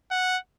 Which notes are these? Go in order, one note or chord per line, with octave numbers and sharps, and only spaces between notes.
F#5